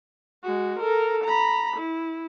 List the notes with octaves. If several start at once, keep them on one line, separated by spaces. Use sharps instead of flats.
G#3 F#4
A4 A#4
A#5 B5
E4